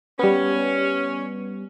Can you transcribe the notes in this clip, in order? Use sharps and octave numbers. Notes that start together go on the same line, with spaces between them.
G3 B3 C#4